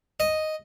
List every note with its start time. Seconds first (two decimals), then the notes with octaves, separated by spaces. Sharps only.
0.20 D#5